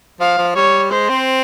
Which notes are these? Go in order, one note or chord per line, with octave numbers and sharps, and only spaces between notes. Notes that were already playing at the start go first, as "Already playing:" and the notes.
F3 F5
F3
G3 C#5
G#3 C5
C4